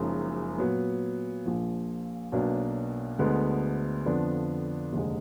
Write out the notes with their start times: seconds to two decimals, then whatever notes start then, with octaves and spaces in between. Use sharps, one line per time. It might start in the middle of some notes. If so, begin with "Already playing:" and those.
Already playing: F#1 F#2 F3 G#3 D#4
0.58 A#2 F#3 B3
1.45 A#1 A#2 F3
2.32 B1 B2 F#3 A#3 D4
3.19 D2 D3 G#3 B3
4.06 F2 D3 F3 B3 D4
4.93 F1 D#2 D3 G#3